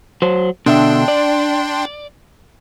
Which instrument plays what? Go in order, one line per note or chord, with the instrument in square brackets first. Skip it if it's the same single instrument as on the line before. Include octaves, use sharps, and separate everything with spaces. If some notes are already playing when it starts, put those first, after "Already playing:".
[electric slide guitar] F#3 C5
[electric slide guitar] B2 D3 E5 [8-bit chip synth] D4 G5 C6
[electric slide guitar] D5